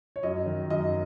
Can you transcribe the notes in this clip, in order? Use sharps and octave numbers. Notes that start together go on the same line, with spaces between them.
C#5
F#2 D#5
D#3
F#2 D#5